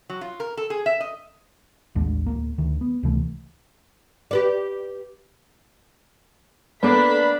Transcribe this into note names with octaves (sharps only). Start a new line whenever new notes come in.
F#3
F4
A#4
A4
G#4
E5
D#5
A1 D#2 G#3 D4
D1 A#3
D2 D#3
B3
C#2 C3 E3 A3
G4 B4 D5
A#3 B3 D4 A4 B4 D5 B5